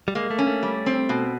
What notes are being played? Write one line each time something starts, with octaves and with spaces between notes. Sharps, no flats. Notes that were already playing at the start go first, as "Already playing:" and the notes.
G3
G#3 A#3
A3
C#4
A3
G3
C4
B2